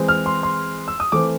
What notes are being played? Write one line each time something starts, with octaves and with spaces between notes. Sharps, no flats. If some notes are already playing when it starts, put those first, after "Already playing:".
Already playing: E3 G#3 C4
F6
C6
C6
E6
D#6
E3 A3 C4 D6